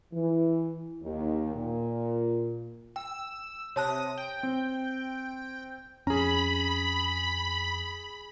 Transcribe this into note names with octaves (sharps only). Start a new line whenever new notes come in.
E3
D#2
A#2
G5 E6
C3 C#5 A5 D#6 F#6 A#6
G5
C4
F2 C#4 G#4 A#5 B5